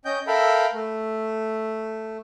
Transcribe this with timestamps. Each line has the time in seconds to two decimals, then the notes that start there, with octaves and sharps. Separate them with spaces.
0.05 C#4 D#5 G5 G6
0.27 A4 A#4 E5 F5 G5 B5
0.73 A3